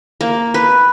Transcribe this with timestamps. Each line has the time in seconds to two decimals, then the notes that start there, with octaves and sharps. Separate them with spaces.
0.21 A#3
0.54 B4